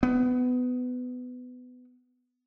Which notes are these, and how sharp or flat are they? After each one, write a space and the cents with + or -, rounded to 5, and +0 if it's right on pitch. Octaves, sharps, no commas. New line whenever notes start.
B3 +20